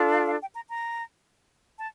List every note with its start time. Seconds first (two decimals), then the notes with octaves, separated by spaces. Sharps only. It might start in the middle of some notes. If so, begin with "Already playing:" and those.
Already playing: D4 F4 A4
0.13 F5
0.27 F5
0.41 G5
0.55 A#5
0.70 A#5
1.78 A5